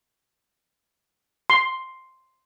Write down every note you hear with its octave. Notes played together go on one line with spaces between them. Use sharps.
C6